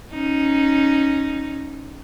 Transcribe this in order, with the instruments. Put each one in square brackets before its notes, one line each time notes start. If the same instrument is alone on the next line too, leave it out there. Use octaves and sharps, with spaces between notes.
[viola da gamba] C#4 D#4